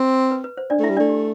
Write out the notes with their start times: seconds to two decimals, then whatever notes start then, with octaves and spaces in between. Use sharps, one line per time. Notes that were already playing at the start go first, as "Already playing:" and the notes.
Already playing: C4
0.31 B4
0.44 B4
0.57 C5
0.70 D4 D5
0.79 A3
0.83 E4 E5
0.90 G3
0.97 A3 D4 D5
1.09 G4